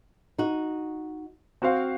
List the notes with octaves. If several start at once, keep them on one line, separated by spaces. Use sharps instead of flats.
D#4 F#4
C4 F#4 C5 F5